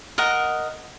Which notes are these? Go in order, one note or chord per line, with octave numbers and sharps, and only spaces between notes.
A#4 D#5 F#5